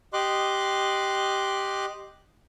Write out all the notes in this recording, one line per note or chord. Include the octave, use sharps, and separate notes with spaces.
G4 D#5 C6 D6 F#6